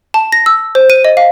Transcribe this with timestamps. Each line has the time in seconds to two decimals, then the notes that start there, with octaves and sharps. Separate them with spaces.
0.14 A5
0.32 A#6
0.46 E6
0.75 C5
0.90 D#7
1.05 D#5
1.17 F5